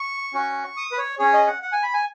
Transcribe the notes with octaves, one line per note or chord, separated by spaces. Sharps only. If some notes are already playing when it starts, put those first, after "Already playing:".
Already playing: C#6
C#4 F#4
D#6
B4
C#5
C#4 G#4 C#5
D#5
F#5
F#5
G#5
B5
G#5